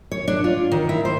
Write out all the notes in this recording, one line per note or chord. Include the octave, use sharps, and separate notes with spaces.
C#5
D4
F4
D#3
E4
C5